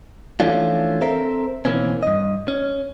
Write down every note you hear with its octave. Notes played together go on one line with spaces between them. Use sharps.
E3 F3 A3 C#4 D4 F4
C4 A4 A#4 C5 E5
B2 D#3 E3 A#3 C4 C#4
G2 D#5
C#4